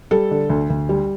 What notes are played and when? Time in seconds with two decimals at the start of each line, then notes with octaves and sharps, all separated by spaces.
0.11 G3 A4
0.31 D3
0.50 D2
0.70 D2
0.89 G3